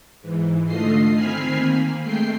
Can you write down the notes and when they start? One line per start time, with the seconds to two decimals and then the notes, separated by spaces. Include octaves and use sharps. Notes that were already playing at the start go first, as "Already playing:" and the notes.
0.22 G#2 E3
0.66 D3 A3 F4 D#5 C7
1.14 D#3 C4 G#5 B5 F6 C7
1.59 A#3
2.04 G#3 A3 G5 C7